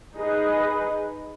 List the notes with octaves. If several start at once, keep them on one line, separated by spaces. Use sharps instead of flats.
D#4 G#4 B4 D#5